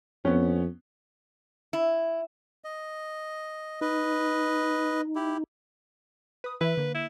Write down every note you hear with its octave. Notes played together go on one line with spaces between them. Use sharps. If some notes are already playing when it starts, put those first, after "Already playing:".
F2 B3 C#4
E4
D#5
D#4 B4 D#5
E4 G4
B4 D#6
E3 E4 B4 E5
D3 A#3
E4